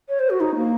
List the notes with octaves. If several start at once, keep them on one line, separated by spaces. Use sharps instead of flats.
C#5
C5
F#4
D#4
A#3